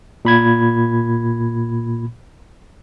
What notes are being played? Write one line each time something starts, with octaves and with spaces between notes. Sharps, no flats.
A#2 B5 G#6